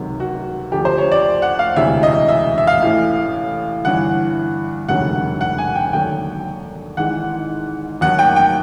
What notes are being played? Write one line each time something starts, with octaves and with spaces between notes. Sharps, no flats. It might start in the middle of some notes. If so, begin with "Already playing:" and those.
Already playing: C#2 C3 D#3 F#3
F#4
D2 D3 F3 G4
C5
C#5
D5
F#5
F5
E1 D2 C3 E3 E5
D#5
E5
E5
F5
A1 A2 E3
G1 G2 E3 F#5
E1 D2 C3 D#3 F#3 F#5
F#5
G#5
G5
D#2 D3 F#3 G5
G#1 G#2 E3 F#5
D#2 D#3 F#3 F#5
G5
G5